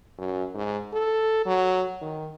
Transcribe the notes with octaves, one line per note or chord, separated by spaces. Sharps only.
F#2
G#2
A4
F#3
D#3